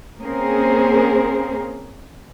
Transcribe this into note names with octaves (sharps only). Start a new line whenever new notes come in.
A#3 C4 C#4 G#4 A#4 C5